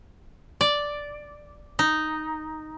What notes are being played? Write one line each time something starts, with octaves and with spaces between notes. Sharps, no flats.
D5
D#4